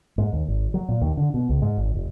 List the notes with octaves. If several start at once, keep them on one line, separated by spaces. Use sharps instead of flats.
G#2
D#2
G#1
F#3
A#2
D#2
D3
B2
C#2
G#2
G#1
F1